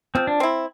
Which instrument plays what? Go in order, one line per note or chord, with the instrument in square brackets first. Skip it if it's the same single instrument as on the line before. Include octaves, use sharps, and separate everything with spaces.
[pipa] F3 [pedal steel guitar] C4
[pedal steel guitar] D4
[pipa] C4 E4